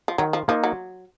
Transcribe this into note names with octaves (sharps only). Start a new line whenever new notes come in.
F3
D#3 F#3
F3
F3 A#3 D#4
F#3